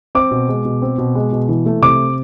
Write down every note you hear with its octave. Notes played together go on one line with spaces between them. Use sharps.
C4 D6
B2
G#3
B2
C4
B2
G#3
B2
E3
A3
C3 D6